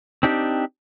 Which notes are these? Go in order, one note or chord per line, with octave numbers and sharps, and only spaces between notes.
C4 D4 D#4 G4